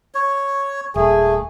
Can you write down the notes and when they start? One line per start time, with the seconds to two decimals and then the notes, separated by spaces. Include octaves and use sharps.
0.15 C#5
0.96 D#1 A3 G#4